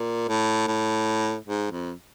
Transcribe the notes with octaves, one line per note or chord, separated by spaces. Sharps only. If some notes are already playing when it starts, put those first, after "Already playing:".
Already playing: A#2
A2
A2
G#2
F2